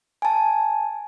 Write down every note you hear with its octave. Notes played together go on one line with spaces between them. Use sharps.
G#5 A5